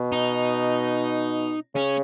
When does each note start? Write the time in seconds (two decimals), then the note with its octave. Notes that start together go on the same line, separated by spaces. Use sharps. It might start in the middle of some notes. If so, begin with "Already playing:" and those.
Already playing: B2
0.12 D#4
1.75 C#3 C#4